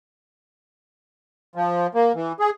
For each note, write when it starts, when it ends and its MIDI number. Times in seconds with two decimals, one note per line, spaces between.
1.56 1.87 53
1.95 2.12 58
2.15 2.33 52
2.40 2.50 68